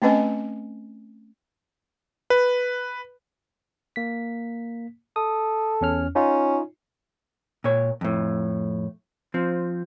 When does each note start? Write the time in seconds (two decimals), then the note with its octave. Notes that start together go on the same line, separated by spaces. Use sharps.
0.02 A3 C4 C#4 B4 D#5 G#5
2.30 B4
3.96 A#3 B6
5.16 A4 D#6
5.81 E2 C#4 F6
6.16 C#4 D#4 F4
7.64 A#2 C#5
8.01 F2 A2
9.34 F3 C4